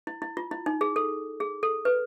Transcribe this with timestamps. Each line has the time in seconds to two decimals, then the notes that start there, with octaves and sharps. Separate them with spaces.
0.07 E4
0.22 E4
0.37 F4
0.51 E4
0.66 D#4
0.81 G#4
0.96 A4
1.40 G#4
1.63 A4
1.85 B4